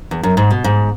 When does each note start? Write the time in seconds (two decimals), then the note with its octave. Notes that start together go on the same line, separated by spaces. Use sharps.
0.11 E2
0.23 F#2
0.37 G#2
0.51 B2
0.64 G#2